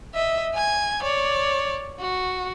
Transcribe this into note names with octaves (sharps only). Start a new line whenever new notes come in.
D#5 E5
G#5 G#6
C#5 D5
F#4